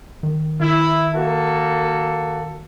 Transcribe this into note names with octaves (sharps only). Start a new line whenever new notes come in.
D#3
D#3 E4
A#3 F#4 A4